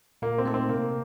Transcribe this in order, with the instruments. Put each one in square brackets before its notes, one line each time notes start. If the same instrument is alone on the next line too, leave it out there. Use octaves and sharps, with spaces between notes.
[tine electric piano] A#2 [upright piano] A#3
[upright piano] C4
[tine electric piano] A3 D#4 A4
[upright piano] C4
[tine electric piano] C3 [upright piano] A#3